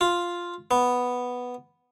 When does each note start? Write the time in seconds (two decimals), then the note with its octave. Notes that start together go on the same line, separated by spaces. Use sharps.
0.01 F4
0.71 B3